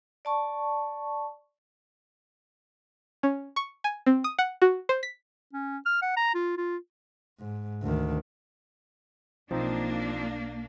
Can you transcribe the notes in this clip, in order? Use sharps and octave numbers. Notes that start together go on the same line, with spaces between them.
D5 A5 C#6
C#4
C#6
G#5
C4
D#6
F#5
F#4
C5
B6
C#4
F6
F#5
A#5
F4
F4
G#2
D2 D#3
B1 F3 A#3 C4 D4 D#4